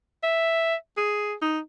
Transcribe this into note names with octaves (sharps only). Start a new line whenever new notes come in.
E5
G#4
D#4